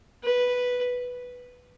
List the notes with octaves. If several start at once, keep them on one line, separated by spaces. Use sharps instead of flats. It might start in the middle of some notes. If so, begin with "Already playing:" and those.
B4